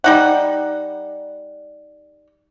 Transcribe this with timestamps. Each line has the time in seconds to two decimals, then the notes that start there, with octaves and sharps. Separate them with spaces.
0.04 G3 D#4 F#5